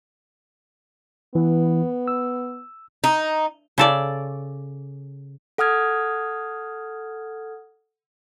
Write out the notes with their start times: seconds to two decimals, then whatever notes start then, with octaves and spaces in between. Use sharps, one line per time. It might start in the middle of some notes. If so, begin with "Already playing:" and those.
1.35 E3 B3
2.08 E6
3.04 D#4
3.78 C#3 A4 D5
5.58 A4 F#5 D#6 F6 G#6